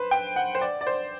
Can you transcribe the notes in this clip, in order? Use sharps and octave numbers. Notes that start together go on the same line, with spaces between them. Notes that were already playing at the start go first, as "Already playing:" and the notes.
Already playing: B4 C5
G5
F#5
C5
D5
D5
C5